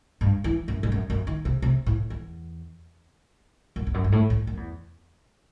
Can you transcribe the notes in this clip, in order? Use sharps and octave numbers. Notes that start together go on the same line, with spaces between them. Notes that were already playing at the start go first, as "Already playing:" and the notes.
G2
E3
F#2
G2
F#2
F#2
D#3
C3
C3
A2
E2
F#2
E2
F#2
G2
A2
A2
F#2
E2